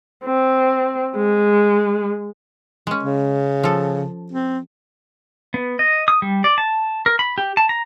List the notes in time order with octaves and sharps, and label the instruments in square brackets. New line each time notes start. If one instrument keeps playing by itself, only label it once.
[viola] C4
G#3
[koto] G#3 C#4
[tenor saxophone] C#3
[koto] F3 A4
[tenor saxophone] C4
[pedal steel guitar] B3
D#5
D#6
G3
D5
A5
A#4
B5
G4
A5
A#5